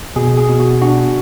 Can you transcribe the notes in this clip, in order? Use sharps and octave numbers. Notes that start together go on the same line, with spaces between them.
B2 G#4
G#4
B2
F#4
D4 F#4